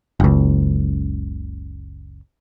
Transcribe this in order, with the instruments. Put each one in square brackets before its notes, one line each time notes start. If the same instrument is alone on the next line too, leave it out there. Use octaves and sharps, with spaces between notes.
[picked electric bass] F#1 C#2